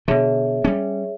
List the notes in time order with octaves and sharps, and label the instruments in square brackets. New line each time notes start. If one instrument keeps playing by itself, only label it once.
[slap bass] B2 D3 [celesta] G#4 C#5 E5
[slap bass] G3 C#4